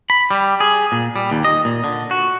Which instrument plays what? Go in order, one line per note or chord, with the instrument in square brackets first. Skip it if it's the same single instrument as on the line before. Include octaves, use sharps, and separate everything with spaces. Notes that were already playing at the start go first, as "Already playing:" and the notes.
[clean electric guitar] B5
G3
G#4
A#2
G3
D#2
D#5
A#2
D3
F#4